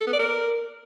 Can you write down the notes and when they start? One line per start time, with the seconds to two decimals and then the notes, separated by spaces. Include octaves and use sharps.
0.01 A4
0.07 B3
0.13 D5
0.19 A#4